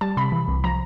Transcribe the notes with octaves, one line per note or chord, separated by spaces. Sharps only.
G3 A5
C3 B5
E3
C2
F3 A#5